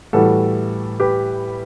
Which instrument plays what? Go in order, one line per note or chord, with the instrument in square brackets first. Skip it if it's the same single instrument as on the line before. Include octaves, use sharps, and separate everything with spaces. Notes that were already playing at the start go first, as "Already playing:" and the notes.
[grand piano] A2 E3 G3 F#4 A4
G4 B4